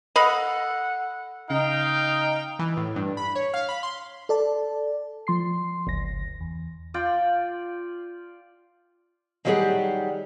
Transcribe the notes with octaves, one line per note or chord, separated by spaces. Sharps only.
A4 D#5 F5 F#5 B5
C#3 D#4 F5 G5
E3
A2
G2
B5
C#5
F5
B5
C6
A4 D5 A5
F3 C6 C7
G1 C#2 A#6
E2
F4 D5 G5
D#3 F#3 G3 G4 G#4 F#5